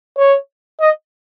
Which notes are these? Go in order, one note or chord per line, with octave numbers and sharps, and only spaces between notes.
C#5
D#5